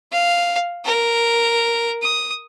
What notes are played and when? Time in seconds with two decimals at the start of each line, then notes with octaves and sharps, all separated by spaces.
0.12 F5
0.85 A#4
2.02 D#6